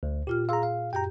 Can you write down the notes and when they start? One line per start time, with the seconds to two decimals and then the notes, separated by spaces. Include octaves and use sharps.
0.03 D2
0.27 A#2 F4 G4 F6
0.49 G#4 F5 A#5 C6 E6
0.63 F5
0.93 F#2 G4 G5 A#5 G6